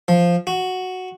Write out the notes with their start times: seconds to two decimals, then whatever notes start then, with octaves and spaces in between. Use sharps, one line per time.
0.08 F3
0.47 F#4